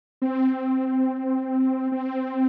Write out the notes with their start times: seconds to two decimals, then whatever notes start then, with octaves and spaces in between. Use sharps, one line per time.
0.22 C4
1.92 C4